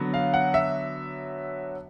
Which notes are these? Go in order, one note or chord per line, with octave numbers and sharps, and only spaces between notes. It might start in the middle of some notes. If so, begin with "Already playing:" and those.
Already playing: D3 F#3 B3
F5
F#5
E5